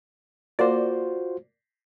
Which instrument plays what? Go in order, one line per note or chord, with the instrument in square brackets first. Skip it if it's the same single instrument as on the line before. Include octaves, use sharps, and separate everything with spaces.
[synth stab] A#3 D5 [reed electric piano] F4 F#4 C5